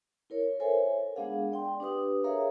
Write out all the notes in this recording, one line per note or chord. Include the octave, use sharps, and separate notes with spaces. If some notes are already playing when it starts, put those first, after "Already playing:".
E4 A#4 C#5
A4 A#4 C5 C#5 E5 G#5
G#3 B3 D4 G#4 F5 F#5
D5 G5 C6
D4 G4 B4 D#6
G#4 A#4 C#5 E5 F5 A#5